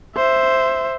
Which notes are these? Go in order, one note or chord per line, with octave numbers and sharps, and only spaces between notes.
C5 E5